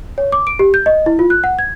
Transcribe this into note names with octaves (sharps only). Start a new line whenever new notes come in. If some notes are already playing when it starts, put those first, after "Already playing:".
C#5
D6
D7
G4
G6
D#5
E4
F4
F#6
F#5
G#6